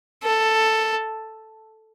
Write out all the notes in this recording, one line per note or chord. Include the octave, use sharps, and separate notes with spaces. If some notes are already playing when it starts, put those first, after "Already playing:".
A4